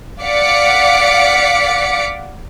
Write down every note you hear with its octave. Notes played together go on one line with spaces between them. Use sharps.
D5 F5 F#5 D6 B6 C#7